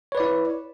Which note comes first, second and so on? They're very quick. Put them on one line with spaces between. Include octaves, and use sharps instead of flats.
C#5 B4 D5 E4